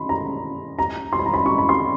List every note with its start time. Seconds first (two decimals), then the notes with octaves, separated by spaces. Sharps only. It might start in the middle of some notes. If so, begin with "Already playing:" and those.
Already playing: B5 C6
0.09 A#5
0.79 A#5
1.13 C6
1.19 B5
1.26 A#5
1.34 B5
1.46 C#6
1.58 B5
1.69 C6